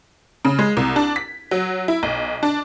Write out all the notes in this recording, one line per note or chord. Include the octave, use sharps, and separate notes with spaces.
C#3
G#3
C2
D4
B6
F#3
E4
B1
D4